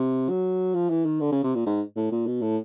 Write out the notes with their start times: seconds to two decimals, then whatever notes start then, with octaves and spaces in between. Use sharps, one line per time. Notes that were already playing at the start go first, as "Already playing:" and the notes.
Already playing: C3
0.30 F#3
0.75 F3
0.90 E3
1.06 D#3
1.21 D3
1.32 C#3
1.44 C3
1.55 A#2
1.66 G#2
1.96 A2
2.12 A#2
2.27 B2
2.42 A2